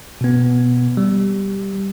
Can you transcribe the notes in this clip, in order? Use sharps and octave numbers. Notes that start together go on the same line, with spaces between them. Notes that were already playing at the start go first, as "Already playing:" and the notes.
B2 B3
G3